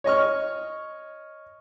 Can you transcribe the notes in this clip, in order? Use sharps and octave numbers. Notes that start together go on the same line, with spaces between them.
C#5 D#5 C#6 F6